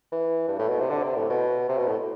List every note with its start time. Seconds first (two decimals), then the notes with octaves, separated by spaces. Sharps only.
0.12 E3
0.48 G2
0.59 A2
0.69 B2
0.79 C3
0.90 D3
1.03 C3
1.16 A2
1.30 B2
1.69 C3
1.78 B2
1.87 A2